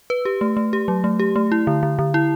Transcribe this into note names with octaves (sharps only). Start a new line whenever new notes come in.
B4
G4
A3
A3
G4
F#3
A3
G4
A3
E4
D3
D3
D3
E4